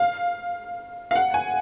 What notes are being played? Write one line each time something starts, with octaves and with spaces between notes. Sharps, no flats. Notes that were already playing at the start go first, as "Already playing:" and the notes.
Already playing: F5
F5
F#5
G#5